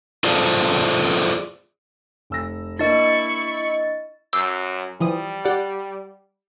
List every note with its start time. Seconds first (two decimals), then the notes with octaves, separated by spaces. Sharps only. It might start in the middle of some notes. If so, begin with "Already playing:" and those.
0.24 F4 G#4 A4 C5 D5
2.30 F1 E6 A#6
2.79 A#3 D4 E4 D#5 C#6 A6
4.33 F#2 D6 E6 G6 C7
5.00 E3 F3 G3 D#6
5.45 G4 D5 F#5